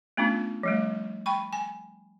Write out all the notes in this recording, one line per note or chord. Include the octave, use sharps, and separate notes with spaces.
A3 B3 C#4 D4 F4
F3 G3 A3
G5 B5 C#6
G#5